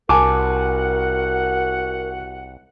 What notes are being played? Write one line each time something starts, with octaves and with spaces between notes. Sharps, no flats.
C2 F#4 A#4 F#5 G#5 A5 D6